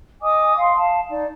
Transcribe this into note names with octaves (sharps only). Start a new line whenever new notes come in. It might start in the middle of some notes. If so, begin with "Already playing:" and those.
D#5 G#5 D6 D#6
F5 C6
F5 A5
D#4 D5